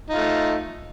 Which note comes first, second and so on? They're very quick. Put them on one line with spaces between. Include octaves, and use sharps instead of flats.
D#4 F4 A3